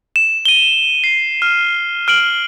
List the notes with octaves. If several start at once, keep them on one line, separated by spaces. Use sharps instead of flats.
E7
D#7 G7
C7
F6
F6 D7 F#7